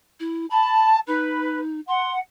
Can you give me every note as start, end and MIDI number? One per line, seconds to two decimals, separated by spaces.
0.20 0.46 64
0.50 0.99 81
0.50 0.89 83
1.08 1.80 63
1.08 1.61 71
1.88 2.19 78
1.88 2.13 84